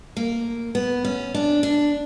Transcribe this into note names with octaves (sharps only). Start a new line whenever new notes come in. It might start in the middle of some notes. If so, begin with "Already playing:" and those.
A#3
B3
C#4
D4
D4